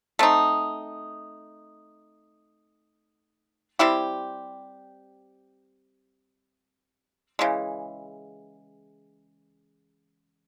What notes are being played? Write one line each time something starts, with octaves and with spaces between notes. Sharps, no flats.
A3 C4 D#4
G3 C4 E4 G4
C#3 E3 G#3